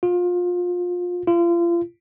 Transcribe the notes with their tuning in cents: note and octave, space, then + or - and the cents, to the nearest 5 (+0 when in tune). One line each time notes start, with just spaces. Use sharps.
F4 +25
F4 -35